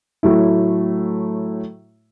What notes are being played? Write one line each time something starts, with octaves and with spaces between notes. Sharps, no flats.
A2 F#3 A3 E4